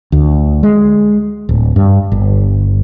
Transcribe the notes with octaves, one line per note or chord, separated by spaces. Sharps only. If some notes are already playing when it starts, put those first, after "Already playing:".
D2
G#3
D1
G2
G1